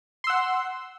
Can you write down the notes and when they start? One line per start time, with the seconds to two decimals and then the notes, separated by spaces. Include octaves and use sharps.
0.24 C6
0.27 E6
0.30 F#5